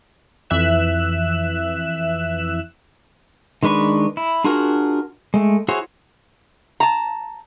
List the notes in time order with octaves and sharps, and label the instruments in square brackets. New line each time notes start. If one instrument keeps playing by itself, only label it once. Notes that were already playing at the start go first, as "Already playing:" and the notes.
[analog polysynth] F2 E3 E5 F#6 E7
[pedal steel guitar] D#3 G#3 D4 B4 C#6
E4
D4 F4 F#4 G#4 A#4
G#3 A3
E4 F#4 G#4 C5 C#5
[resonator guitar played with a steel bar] A5 A#5